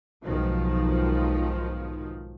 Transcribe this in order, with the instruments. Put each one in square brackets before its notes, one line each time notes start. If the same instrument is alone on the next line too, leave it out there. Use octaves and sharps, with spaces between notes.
[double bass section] B1 G#2 D#3 F3